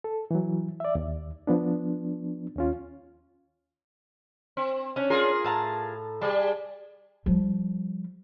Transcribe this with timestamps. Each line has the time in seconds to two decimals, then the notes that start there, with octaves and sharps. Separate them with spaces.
0.04 A4
0.31 E3 F#3
0.80 D5 E5
0.95 D#2
1.47 F3 B3 D4
2.57 D#2 C#4 F4
4.57 C4
4.96 C#4 D4 C#5
5.10 F4 G#4 A#4
5.44 A2 A5 A#5
6.21 G3 G#4 D5 A5
7.26 F3 G3